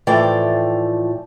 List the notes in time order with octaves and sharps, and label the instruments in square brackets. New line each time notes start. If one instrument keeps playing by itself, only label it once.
[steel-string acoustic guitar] A2 E3 F3 D5 G5